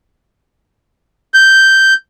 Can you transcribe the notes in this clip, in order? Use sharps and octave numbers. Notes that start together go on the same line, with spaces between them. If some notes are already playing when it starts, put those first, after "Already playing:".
G6